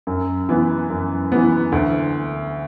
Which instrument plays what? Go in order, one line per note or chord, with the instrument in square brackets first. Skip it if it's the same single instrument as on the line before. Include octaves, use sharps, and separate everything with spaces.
[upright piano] F#2
E3 B3
F#2
E3 B3
D2